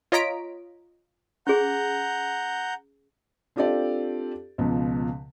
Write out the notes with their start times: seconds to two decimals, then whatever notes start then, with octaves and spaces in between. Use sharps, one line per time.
0.12 F4 C#5 D#5 A#5 B6 D7
1.47 C#4 G#4 F#5 A#5 G6
3.56 C4 D4 F4 G4 A4 D5
4.58 C#2 B2 F3